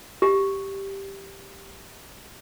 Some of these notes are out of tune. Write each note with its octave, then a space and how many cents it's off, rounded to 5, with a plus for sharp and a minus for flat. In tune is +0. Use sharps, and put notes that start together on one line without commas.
G4 +0